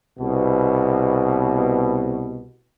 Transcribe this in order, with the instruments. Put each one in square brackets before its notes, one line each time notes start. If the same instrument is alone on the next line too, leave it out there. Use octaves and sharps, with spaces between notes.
[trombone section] C2 B2